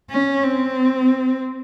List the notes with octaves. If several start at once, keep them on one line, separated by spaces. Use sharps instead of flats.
C#4
C4